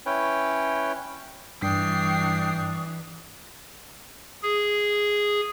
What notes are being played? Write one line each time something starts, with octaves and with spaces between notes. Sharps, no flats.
C#4 E4 B4 C#5 G5
G2 E3 D4 G5 C#6 D#6 C7
G#4